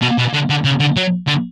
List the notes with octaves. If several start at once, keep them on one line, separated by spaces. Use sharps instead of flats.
B2
B2
D3
D3
C#3
D3
F#3
D3